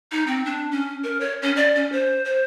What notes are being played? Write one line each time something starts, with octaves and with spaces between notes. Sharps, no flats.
D#4
C4
D4
C#4
A#4
C#5
C#4
D5
C#4
C5
C5